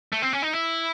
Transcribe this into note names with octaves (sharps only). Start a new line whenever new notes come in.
A3
C4
C#4
D#4
E4